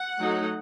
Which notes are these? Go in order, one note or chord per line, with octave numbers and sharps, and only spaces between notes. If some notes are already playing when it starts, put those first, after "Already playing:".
Already playing: F#5
F#3 A3 D#4